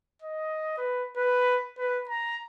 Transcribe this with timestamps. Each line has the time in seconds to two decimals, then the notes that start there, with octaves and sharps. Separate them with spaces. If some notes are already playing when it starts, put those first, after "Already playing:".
0.22 D#5
0.78 B4
1.17 B4
1.78 B4
2.09 A#5